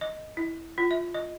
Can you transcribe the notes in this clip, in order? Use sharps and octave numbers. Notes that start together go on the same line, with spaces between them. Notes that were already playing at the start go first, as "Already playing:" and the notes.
D#5
E4
F4
E5
D#5